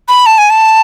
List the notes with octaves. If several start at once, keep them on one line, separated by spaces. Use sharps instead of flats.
B5
A5
G#5
A5